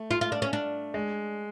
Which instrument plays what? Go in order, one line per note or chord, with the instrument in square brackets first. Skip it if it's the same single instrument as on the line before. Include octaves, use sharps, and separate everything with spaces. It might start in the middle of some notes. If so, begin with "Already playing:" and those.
Already playing: [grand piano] A3
[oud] F4
F4
D4
C#4
D4
[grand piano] G#3